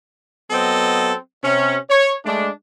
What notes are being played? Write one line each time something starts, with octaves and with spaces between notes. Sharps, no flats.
F#3 B3 C4 A4 D#5
C3 C#4
C#5
G#3 A3 D4